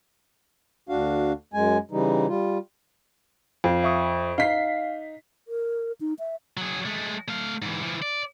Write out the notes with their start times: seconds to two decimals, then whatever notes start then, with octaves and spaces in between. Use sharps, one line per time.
0.89 D2 D4 F#4 F5
1.53 F#2 G#3 G#5
1.91 C#3 E3 G3 D#4
2.28 G3 F4
3.64 F2 F5
3.84 E5 C#6 D#6
4.38 D#4 F5 B6 C7
5.48 A#4
6.01 D#4
6.19 E5
6.57 F#3 G#4
6.85 G#3 A3
7.28 A3 F5
7.62 G#2 E3
7.82 E3 F3
8.02 D5